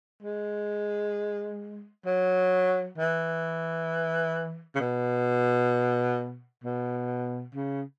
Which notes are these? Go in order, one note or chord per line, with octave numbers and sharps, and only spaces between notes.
G#3
F#3
E3
C#3
B2
B2
C#3